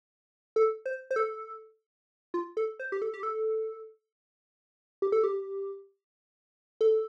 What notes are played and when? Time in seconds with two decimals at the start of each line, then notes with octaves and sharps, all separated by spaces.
0.56 A4
0.86 C5
1.11 C5
1.16 A4
2.34 F4
2.57 A4
2.79 C5
2.92 G4
3.02 A4
3.14 G4
3.23 A4
5.02 G4
5.12 A4
5.23 G4
6.81 A4